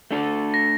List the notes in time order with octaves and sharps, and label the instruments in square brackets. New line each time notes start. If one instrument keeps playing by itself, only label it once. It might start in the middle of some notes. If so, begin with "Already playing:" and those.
[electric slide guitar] A3 D4 A4
[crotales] A#6